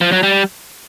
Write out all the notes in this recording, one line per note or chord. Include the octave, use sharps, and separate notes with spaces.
F3
F#3
G3